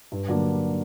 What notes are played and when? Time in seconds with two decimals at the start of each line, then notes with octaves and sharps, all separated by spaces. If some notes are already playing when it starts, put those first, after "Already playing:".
0.12 G2
0.28 D3 F#3 A#3 D4